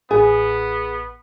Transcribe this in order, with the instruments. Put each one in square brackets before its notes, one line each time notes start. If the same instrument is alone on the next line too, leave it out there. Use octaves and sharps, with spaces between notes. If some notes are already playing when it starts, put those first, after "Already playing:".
[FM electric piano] A1 [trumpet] B3 [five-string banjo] G#4